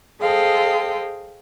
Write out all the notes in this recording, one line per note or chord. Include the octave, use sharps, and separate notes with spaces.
G#4 A4 C5 D#5 F5 G5